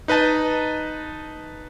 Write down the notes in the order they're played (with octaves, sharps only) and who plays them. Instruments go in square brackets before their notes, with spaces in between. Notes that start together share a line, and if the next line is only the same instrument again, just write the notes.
[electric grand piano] D#4 B4 D#5 A5